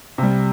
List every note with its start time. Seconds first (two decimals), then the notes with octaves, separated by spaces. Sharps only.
0.18 C3 G3